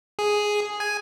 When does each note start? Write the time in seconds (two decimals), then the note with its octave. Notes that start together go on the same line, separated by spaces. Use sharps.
0.19 G#4
0.80 G#5